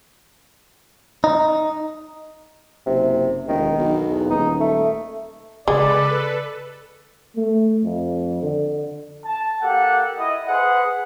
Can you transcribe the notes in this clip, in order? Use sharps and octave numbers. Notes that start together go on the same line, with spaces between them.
D#4
F#1 C3
E1 D#3
B1
E2
D#1 D#4
A3
C#3 G#3 A4 B4 D5
A3
F2
D3
A5
A#3 G4 A4 F#5
E4 D#5
G#4 B4 C5 F#5